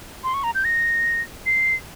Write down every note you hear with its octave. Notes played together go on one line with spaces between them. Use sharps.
C6
C#6
A#5
G6
A#6
C7